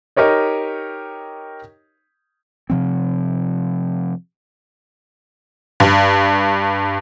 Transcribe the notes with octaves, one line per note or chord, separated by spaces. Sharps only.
D#4 G4 A#4 C#5 D#5
C3 F3 C4
G2